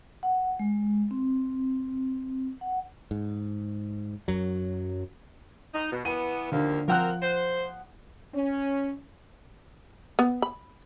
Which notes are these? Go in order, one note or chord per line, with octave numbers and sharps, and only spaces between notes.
F#5
G#3
C4
F#5
G#2
F#2 F#3
D#4
B2
E3 B3 D#7
D#2 D3 F3 A#3
F3 C4 A#4 F#5 F#6
C5
C#4
B3
B5